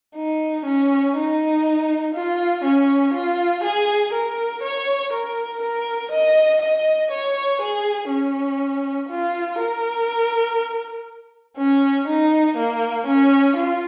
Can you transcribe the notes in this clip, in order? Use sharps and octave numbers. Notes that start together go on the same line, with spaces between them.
D#4
C#4
D#4
F4
C#4
F4
G#4
A#4
C#5
A#4
A#4
D#5
D#5
C#5
G#4
C#4
F4
A#4
C#4
D#4
A#3
C#4
F4